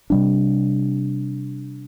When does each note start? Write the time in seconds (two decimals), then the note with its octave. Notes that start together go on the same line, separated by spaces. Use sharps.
0.10 C3 G3 D4